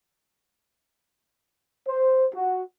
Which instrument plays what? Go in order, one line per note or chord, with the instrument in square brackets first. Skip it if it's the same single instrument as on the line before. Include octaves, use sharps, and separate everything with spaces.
[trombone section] C5
F#4